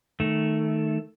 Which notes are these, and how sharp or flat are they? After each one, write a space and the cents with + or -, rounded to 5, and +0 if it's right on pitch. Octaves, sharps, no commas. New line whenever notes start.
D#3 +0 A3 +0